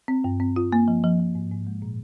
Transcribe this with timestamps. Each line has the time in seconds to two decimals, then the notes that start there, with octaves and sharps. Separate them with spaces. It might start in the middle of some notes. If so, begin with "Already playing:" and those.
0.08 C4
0.24 G2
0.40 C4
0.56 F4
0.72 A#3
0.88 F3
1.04 F3
1.20 F3
1.35 G#2
1.51 G#2
1.67 G#3
1.82 A#2